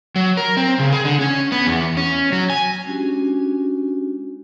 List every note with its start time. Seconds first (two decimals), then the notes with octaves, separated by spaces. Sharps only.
0.16 F#3
0.37 A#4
0.57 C4
0.79 C#3
0.93 G#4
1.05 D3
1.21 C#4
1.52 B3
1.67 E2
1.97 C#4
2.32 F#3
2.50 G#5
2.86 G#3 C#4 D4 E4 F#4 G4